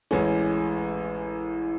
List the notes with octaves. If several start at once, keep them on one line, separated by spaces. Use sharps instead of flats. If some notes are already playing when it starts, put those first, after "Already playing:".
A1 A2 G#3 C#4